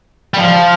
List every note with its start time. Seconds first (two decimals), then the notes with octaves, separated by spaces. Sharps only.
0.34 G3
0.38 F3